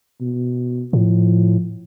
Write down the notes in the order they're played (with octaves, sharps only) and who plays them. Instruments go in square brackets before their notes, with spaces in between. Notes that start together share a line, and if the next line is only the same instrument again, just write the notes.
[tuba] B2
[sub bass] A2 [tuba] F3